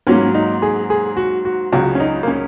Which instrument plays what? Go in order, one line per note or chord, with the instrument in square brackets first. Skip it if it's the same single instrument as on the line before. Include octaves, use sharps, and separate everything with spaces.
[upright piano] G#2 F#3 A#3 [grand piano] C#4
[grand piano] D#4
G#4
G#4
F#4
F#4
[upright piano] C#2 C#3 F#3 [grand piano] F#4
[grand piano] C#4
D#4
A#3
C#4